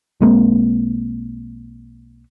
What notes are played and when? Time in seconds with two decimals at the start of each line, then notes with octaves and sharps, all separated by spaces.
0.20 B1 G#3 A#3 C4